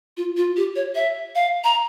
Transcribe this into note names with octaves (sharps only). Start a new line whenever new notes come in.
F4
F4
G4
C#5
E5
F5
A#5